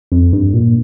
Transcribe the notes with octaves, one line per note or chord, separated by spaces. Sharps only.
F2
G2
A#2